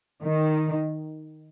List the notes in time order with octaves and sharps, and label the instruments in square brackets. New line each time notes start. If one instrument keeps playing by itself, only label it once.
[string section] D#3